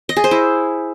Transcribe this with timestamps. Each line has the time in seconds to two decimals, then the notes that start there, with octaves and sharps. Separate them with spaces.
0.09 D#5
0.17 G#4
0.24 C5
0.31 E4